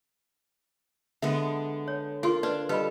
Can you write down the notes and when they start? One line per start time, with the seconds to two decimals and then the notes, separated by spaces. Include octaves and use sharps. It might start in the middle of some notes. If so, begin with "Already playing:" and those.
1.22 D3 G#3 B3 E5
1.88 C#5
2.23 F4 G#4 A#4 C6
2.43 D4 B4 D5
2.69 G3 A4 B4 D#5 B5